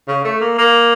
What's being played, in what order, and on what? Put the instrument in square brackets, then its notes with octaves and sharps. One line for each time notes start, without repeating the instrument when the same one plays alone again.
[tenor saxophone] C#3
A3
A#3
A#3